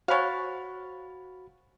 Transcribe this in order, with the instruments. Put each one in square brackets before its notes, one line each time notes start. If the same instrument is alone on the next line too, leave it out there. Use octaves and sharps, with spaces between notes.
[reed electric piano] F#4 B5 A6 [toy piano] C5 G#5 C#6 [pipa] C#5 F5